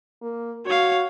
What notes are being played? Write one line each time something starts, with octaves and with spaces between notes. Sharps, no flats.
A#3
F#4 C#5 F5